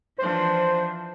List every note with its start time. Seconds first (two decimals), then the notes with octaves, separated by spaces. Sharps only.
0.18 E3 F3 D4 C5